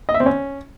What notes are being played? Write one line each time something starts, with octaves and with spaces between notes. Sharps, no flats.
D#5
E5
C4
C#4